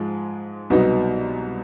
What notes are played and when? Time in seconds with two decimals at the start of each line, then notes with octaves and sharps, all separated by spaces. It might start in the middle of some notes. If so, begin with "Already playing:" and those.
Already playing: G#2 F3 G#3
0.70 C2 B2 F#3 B3 D#4